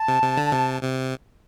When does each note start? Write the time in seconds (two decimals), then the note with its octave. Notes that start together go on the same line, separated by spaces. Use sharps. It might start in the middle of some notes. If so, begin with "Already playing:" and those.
Already playing: A5
0.08 C3
0.22 C3
0.37 D3
0.52 C3
0.83 C3